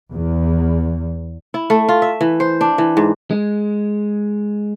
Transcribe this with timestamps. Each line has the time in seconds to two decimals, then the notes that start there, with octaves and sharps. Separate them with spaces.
0.12 E2
1.54 E4
1.70 A3
1.89 F4
2.02 E5
2.21 E3
2.40 C5
2.61 D4
2.78 E3
2.97 G#2
3.31 G#3